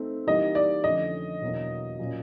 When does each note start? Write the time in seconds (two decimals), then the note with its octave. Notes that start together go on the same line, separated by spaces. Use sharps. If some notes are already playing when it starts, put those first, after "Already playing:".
Already playing: A3 C4 D#4
0.27 E3 G3 A#3 D#4 G4 D#5
0.55 D5
0.84 F2 D3 F3 A3 C#4 D#5
1.42 E2 B2 F#3 A#3 D4
1.99 A#2 F#3 A#3 C#4